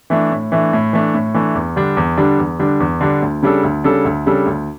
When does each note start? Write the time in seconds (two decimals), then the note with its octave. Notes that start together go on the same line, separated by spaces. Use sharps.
0.10 E3 A3 D4
0.32 A2
0.52 E3 A3 D4
0.73 A2
0.93 E3 A3 D4
1.15 A2
1.34 E3 A3 D4
1.55 E2
1.76 D3 G3 D4
1.97 E2
2.17 D3 G3 D4
2.39 E2
2.59 D3 G3 D4
2.80 E2
3.01 D3 G3 D4
3.22 D2
3.43 C#3 G3 D4 A4
3.63 D2
3.84 C#3 G3 D4 A4
4.05 D2
4.26 C#3 G3 D4 A4
4.46 D2